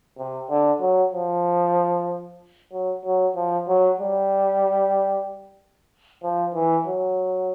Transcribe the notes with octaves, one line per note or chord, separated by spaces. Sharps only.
C3
D3
F#3
F3
F#3
F#3
F3
F#3
G3
F3
E3
F#3